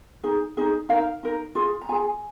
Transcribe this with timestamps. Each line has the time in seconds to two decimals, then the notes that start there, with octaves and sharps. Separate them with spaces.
0.24 D#4 G#4
0.57 D#4 G#4
0.89 D#4 A#4 F5
1.23 D#4 A#4
1.55 F4 G#4
1.81 A#5
1.89 F4 G#4 G#5